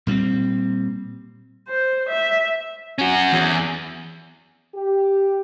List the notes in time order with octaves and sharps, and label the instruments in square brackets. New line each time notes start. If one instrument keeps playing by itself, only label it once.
[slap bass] A#2 G3 B3 C4
[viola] C5
E5
[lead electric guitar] C#4 F#4
E2
[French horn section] G4